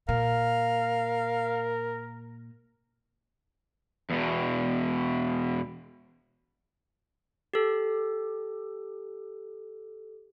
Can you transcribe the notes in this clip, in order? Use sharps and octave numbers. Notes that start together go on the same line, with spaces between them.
A#2 A#4 F5
E2 B2
G4 A4